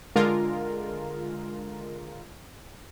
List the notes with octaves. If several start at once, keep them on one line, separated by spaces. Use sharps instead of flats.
D3 G#3 F4 A#4